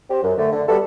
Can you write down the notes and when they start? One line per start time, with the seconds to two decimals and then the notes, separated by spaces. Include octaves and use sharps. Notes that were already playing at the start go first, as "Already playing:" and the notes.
0.09 C4 G4 C5
0.23 F#2
0.38 D3 A3
0.52 D3
0.67 G3 B3 F#4 A4